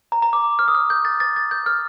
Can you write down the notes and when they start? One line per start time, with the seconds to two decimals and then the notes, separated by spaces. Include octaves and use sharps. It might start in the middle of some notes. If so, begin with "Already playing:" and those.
0.12 A#5
0.22 A#5
0.33 D6
0.59 F6
0.68 D#6
0.75 F6
0.90 G6
1.05 A6
1.20 A6
1.36 A6
1.51 G6
1.66 F6